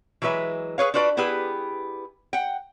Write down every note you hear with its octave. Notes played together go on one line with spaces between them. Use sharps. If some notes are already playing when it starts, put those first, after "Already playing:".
E3 F#3 G#3 B4 E5
G#4 B4 C#5 F5
D4 F4 F#4 B4 D5
B3 E4 G4 G#4 B4
F#5 G5